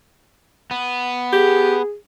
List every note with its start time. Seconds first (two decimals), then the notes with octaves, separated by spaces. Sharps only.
0.71 B3
1.33 G4 G#4